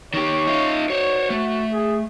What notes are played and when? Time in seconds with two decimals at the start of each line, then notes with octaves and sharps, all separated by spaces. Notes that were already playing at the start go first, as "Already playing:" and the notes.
0.14 D#3 G4 C#5
0.47 D#4 F4
0.90 F#4 C5 C#5
1.30 A3
1.72 G#4